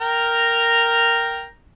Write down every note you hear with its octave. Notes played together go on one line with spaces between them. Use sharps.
A#4 G5 A#5